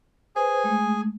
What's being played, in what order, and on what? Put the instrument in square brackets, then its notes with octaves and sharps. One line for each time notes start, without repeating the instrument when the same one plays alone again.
[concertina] G#4 G#5 [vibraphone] B4 C5
[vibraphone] G#3 A3